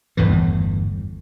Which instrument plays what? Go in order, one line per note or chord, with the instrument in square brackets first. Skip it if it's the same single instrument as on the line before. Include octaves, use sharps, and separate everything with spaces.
[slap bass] G1 E2 A2 E3